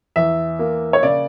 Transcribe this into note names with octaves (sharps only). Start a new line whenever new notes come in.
E2 E5
A#3
C#5
C#3 D5